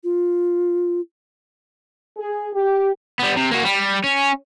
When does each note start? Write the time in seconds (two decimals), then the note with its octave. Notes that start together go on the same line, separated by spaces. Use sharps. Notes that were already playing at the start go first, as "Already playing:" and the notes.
0.04 F4
2.17 G#4
2.53 G4
3.19 G3 B3
3.36 C3
3.51 A#3 F#4
3.65 G3
4.04 C#4